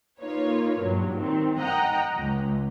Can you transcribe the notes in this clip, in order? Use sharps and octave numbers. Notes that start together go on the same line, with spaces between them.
A#3 D#4 F4 B4 C#5
G2 A#2 F#3
D#3 C4
D#5 F#5 G5 A#5
C#2